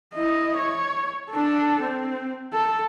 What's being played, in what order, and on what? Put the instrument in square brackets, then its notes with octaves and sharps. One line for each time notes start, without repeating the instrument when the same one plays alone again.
[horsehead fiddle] E4 D#5
C#5
D4 A4
C4
A4